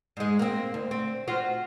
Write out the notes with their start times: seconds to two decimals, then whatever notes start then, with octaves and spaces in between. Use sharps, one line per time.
0.17 G#2 G#3
0.39 A#3 C4
0.74 D2
0.91 C4
1.28 F4 F#4 C5